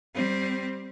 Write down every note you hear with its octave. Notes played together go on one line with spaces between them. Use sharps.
G3 C4